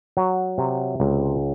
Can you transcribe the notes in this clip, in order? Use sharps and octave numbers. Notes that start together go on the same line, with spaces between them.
F#3
C3
C#2